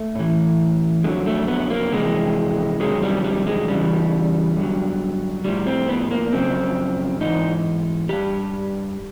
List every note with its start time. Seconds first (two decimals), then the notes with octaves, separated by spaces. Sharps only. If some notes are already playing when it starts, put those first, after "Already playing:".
Already playing: A3
0.15 A2 E3
1.04 F2 D3 F#3 G#3
1.26 A3
1.47 B3
1.70 A#3
1.92 F2 C3 E3 G#3
2.80 F2 C3 D#3 F#3 G#3
3.03 G3
3.24 G3
3.47 G#3
3.68 E2 C#3 E3 G3
4.57 G2 D3 F#3
5.44 A2 F3 G3
5.67 C4
5.89 B3
6.11 A#3
6.32 F#2 C#3 F3 C4
7.21 G#2 E3 D#4
8.09 E3 G4
8.13 G2